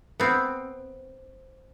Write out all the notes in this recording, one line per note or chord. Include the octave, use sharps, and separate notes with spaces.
B3 C4